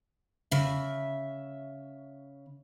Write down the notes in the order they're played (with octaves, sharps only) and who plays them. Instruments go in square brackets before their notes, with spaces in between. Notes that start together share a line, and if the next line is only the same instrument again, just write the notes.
[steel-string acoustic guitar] C#3 E5